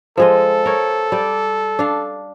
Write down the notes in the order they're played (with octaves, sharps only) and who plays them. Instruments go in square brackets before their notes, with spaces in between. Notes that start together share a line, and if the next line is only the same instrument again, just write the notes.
[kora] F3 G#3 D#5 [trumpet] A4
[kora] A#4 C#5
G3 D5
D4 F5